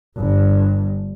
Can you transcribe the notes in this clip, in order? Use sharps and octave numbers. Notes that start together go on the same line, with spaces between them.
G1 G2